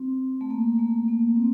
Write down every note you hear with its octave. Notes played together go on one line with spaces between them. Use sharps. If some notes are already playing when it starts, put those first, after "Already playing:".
Already playing: C4
A3
A#3
A3
A#3
C4